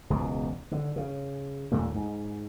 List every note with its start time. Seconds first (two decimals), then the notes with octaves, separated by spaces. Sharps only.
0.10 E1 C#2 G#2 B2
0.71 D3
0.96 C#3
1.72 D#2 A#2 G3 A3
1.94 G#2